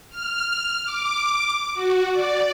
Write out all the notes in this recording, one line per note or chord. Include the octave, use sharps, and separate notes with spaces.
F6
D6
F#4
D5